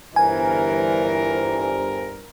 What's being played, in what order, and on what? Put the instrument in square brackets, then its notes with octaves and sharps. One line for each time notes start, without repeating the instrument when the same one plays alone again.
[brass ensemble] G1 G3 C5 [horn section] G2 A#4 [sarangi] E3 [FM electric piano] G#5